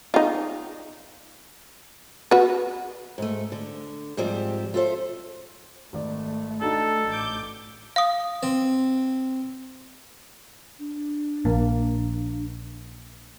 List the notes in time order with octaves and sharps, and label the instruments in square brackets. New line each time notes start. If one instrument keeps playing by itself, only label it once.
[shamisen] D#4 F4
F#4 B4
[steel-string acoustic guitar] G#2 A3
D3
G#2 F3 G3 C4 G4
F4 A4 C5 E5
[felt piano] G#1 D5 [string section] A3
[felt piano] D4 D#4 F#4 [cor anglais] A4
[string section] A1 D6 G6
[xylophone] F5 D#6
[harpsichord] C4
[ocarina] D4
[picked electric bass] A#1 [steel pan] A#3